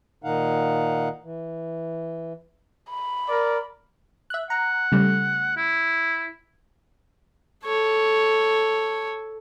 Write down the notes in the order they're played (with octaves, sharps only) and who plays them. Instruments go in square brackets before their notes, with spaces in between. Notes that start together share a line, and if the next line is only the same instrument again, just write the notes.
[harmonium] A#2 D#3 D#4 F5 F#5
E3
[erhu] B5
[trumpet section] A#4 D5
[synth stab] E5 F#6
[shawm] F#5 [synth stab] A#5
[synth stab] C#3 G3 A3
[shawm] E4
[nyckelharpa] A4 C#5